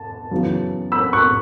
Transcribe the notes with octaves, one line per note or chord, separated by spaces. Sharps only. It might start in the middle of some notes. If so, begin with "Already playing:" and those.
Already playing: A5
F#2 C#3 E3 B3
B5 E6
C#6 F#6